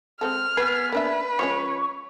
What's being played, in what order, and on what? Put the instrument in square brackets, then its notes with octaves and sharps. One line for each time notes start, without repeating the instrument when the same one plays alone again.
[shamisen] G#3 C4 A4 [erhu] F6
[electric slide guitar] B3 G#4 [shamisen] B4
[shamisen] A#3 D4 E5 [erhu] B4
[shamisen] F3 G#3 C#4 [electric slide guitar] C#5